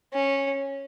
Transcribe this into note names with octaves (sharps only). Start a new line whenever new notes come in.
C#4